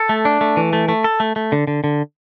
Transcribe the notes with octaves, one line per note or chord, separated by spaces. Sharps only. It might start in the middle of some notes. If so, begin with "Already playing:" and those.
Already playing: A4
A3
D4
A3
E3
A3
A3
A4
A3
A3
D3
D3
D3